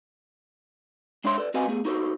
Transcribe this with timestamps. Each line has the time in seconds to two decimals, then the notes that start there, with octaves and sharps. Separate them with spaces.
1.24 G#3 D4 C5 C#5 E5 C6
1.38 A4 B4 D5
1.54 C4 F#4 B4 D#5 F5 G#5
1.67 A3 B3 G#4
1.85 D#4 F#4 A4 C5